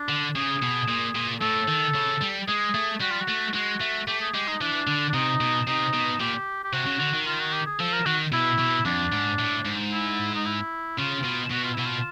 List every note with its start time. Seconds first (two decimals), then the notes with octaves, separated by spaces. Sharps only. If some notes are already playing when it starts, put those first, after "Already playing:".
Already playing: D4
0.09 D3
0.36 C#3 G#4
0.62 B2
0.89 A#2
1.15 A#2
1.41 A2 A4
1.68 D#3
1.95 C#3
2.21 G3
2.47 G#3 G#4
2.74 A3
3.01 G3 F#4
3.10 F4
3.20 F#4
3.28 A3
3.54 G#3 F#4
3.81 A3
4.07 A3 G4
4.21 G#4
4.34 G#3 G4
4.47 D#4
4.61 E3 D4
4.87 D3
5.09 D4
5.14 C3 D#4
5.41 B2
5.67 C3 D#4
5.94 B2
6.20 A#2 G4
6.64 G4
6.73 C3 F#4
6.86 C#3
7.00 D3
7.14 D#3
7.26 F4
7.39 F#4
7.52 G4
7.66 G#4
7.79 F3 A4
7.93 A#4
8.06 D#3 F#4
8.32 B2 E4
8.59 B2
8.85 F2 D4
9.12 G#2
9.39 A2
9.66 G#2
9.92 E4
10.34 D#4
10.45 E4
10.99 C#3 F4
11.24 B2
11.51 B2 F#4
11.64 F4
11.75 B2 E4
11.86 F4